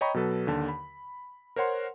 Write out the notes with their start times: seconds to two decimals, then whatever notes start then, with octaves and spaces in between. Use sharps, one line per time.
0.01 C#5 D#5 G5 A#5 B5 C#6
0.14 B2 F#3 A4 B4
0.47 D#2 D3 A5
0.69 B5
1.56 A#4 C5 C#5 F#5 C6